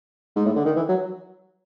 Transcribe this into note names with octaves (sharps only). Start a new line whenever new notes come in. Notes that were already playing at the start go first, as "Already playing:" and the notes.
G#2
A2
D3
D#3
E3
F#3